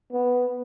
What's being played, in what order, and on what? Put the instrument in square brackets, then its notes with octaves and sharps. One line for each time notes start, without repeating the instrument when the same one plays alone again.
[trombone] B3